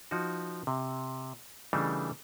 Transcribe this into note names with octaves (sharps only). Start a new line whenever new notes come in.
F3 D#4 F#4
C3
C#3 E3 G3 A3 D4 D#4